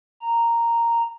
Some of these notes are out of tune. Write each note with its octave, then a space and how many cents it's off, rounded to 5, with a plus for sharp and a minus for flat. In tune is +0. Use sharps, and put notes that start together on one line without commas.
A#5 -5